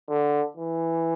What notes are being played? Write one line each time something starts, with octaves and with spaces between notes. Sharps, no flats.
D3
E3